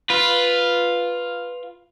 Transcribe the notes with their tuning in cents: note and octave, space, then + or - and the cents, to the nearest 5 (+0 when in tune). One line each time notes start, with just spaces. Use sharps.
F4 +0 B4 +0